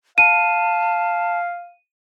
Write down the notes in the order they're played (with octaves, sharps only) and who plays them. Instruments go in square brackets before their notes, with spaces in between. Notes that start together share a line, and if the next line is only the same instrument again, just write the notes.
[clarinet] F5 [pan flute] A5 [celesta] D#7